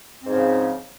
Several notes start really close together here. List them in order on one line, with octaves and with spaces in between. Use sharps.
C4 G#2 F3 C#3